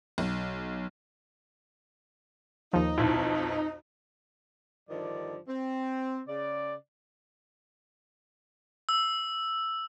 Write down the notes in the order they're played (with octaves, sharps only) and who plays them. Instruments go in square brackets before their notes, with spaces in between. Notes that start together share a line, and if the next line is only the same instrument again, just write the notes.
[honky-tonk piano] B1
[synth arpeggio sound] D#2 F3 [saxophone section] D#4
[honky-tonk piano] B1 F2 [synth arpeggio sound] E4
[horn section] G2 D3 D#3 F3 D5
C4
C#3 D5
[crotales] E6